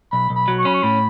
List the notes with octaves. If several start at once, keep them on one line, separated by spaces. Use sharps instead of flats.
B1 B5
B1
B5
F#3
C#6
C#4 B5
C#6
A2 B5